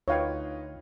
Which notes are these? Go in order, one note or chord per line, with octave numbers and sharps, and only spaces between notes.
D2 D#4 F4 B4 C#5 F5 G5